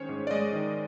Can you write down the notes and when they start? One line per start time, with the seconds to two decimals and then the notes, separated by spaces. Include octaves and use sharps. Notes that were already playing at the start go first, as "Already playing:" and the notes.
Already playing: D#3 G#3 C#4 C5 C#5
0.09 G#2
0.27 D5
0.31 G#3 D#5
0.53 D#3